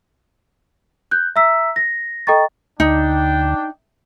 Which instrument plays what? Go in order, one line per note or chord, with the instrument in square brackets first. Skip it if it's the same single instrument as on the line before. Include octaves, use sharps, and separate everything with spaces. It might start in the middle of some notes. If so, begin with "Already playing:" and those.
[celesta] F#6 G6
E5 A#5 E6 B6
A#6
A4 D#5 G5 A#5 C#6 A6
[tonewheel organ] D2 [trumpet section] D4 G5 [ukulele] D#4